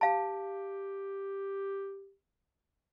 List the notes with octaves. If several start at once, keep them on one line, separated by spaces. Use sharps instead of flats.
G4 F5 A5